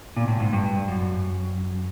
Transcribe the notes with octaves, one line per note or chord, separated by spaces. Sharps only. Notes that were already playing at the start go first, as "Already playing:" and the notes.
A#2
A2
G#2
G2
F#2